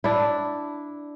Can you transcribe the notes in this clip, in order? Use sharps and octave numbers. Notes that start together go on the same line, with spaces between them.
D4 E4